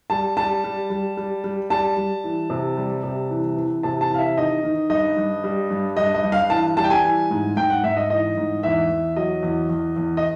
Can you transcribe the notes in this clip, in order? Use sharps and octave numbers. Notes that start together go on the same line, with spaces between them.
G3 A5
G3 A5
G3
G3
G3
G3
G3 A5
G3
E3
C3
G3
C3
E3
E3
C3 A5
A5
E3 F5
E5
D#3 D#5
D#3
G2 D#5
G2
G3
G2
G2 D#5
D#5
G2
F5
E3 A5
G3 A5
G5
G#5
E3
G#2
G#2 G5
F#5
G#2 E5
D#5
E3 D#5
G#2
E2 E5
E2
F#3 D#5
E2
E2
E2
D#5